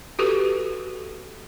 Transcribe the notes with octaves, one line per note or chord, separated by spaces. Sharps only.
F#4 G4 A4 B4